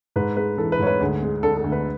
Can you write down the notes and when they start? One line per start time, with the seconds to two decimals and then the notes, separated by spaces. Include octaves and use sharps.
0.16 G#2 B4
0.37 G#3 B4
0.57 E3 A4
0.72 B4
0.79 G#2 C#5
0.87 B4
1.00 D2 G#4
1.22 G#3
1.43 D3 A4
1.57 A4
1.64 D2
1.72 B4